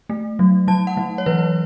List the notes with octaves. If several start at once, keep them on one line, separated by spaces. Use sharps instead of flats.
A3
F#3
F#3 A5
F#5
F#3
C#5
E3 B4